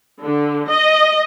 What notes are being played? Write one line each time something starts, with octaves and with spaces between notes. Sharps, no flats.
D3
D#5